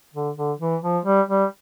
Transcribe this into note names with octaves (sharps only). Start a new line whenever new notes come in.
D3
D3
E3
F3
G3
G3